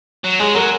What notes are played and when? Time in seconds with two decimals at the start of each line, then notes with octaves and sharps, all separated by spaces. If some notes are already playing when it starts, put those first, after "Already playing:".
0.24 F#3
0.40 G#3 G#4
0.55 F#3 A#4